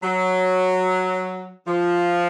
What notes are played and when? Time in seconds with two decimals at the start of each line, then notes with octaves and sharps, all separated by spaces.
0.03 F#3
1.67 F3